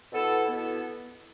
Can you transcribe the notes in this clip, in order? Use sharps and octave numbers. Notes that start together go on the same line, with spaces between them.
B2 B3 E4 A4
B2 B3 E4 A4